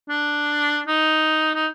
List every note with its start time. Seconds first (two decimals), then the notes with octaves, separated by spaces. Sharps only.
0.10 D4
0.88 D#4
1.55 D#4